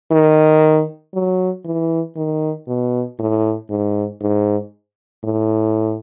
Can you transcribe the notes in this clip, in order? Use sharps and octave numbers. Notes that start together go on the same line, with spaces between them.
D#3
F#3
E3
D#3
B2
A2
G#2
G#2
A2